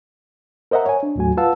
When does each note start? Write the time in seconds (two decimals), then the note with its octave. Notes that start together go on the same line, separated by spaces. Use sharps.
0.71 A#4 C5 D#5 E5 F#5 A#5
0.85 C#5 G#5
1.03 D4
1.16 D#2 A2 F#3 A3 F#4 G#5
1.37 F4 B4 F5 F#5 A5 E6